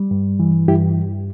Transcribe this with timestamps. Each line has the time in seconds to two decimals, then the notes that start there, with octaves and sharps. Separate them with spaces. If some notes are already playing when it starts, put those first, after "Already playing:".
Already playing: G3
0.11 G2
0.40 E3
0.68 G2 E4 G4